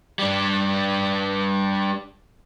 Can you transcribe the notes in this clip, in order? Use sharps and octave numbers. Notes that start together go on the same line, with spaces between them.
G3 D4